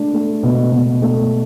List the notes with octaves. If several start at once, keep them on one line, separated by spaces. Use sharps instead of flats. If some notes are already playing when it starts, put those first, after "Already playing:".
Already playing: A3 D4
A3
B2
B2
A3